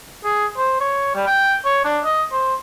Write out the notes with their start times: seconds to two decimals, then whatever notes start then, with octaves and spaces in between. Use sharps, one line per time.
0.24 G#4
0.57 C5
0.80 C#5
1.15 G3
1.27 G5
1.65 C#5
1.85 D4
2.04 D#5
2.32 C5